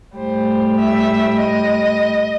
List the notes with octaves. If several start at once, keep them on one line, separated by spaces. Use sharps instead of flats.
A2 G3 C5
E5
D#5